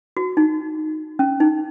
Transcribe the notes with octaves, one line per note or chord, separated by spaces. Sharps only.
F#4
D#4
C#4
D#4